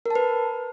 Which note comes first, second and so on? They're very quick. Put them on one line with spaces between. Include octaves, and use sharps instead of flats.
A#4 A5 B4